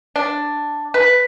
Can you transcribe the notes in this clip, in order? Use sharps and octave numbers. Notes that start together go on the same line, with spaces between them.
D4
B4